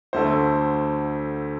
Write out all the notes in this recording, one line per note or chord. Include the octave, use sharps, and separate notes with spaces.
D2 D3 A3 C5